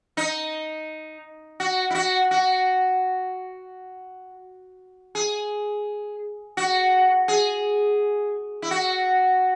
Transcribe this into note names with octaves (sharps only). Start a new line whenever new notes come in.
D#4
F#4
E4
F#4
F#4
G#4
F#4
G#4
E4
F#4